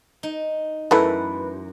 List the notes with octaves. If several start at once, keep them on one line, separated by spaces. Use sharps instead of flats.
D#4
F#2 E3 A3 B4